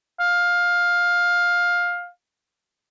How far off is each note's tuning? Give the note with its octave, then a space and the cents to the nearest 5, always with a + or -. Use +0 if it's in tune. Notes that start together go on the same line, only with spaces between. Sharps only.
F5 +15